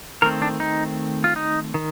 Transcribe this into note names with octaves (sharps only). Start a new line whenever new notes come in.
D#3 A3 C4 A#4
D4
D#4
F4
D#4
D#3